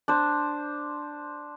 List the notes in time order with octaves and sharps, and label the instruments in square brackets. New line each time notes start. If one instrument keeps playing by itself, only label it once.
[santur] D4 C5